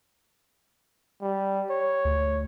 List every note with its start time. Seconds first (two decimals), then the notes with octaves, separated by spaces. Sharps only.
1.22 G3
1.70 C#5
2.05 D2